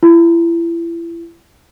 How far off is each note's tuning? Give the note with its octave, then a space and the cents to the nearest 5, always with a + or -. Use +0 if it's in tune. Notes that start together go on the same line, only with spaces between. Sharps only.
E4 +30